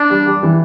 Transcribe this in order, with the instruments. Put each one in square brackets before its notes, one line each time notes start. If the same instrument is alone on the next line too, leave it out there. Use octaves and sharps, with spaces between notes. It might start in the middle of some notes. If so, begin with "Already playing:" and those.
Already playing: [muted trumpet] D4
[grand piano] G3
G3
E3